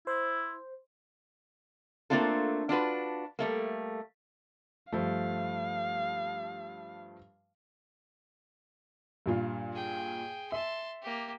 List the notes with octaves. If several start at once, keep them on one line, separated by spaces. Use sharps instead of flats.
E4 C5
A3 A#3 C4 D4 F4 A4
D4 F4 F#4 B4
G3 A3 A#3
G2 F3 A3 F5
G2 A#2 F4
G#4 G5
E5 A5 C6
A#3 G4